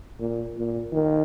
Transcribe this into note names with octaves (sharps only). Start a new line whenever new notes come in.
A#2
A#2
D#3